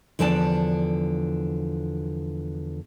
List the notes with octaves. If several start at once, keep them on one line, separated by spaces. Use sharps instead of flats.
E2 D3 F3 D4 G#5 A5